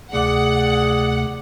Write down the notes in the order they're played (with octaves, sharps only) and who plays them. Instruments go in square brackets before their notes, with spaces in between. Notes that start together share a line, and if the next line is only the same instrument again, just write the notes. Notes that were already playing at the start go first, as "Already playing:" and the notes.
[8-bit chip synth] D2 C3 A3 [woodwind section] G#4 D5 [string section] F#5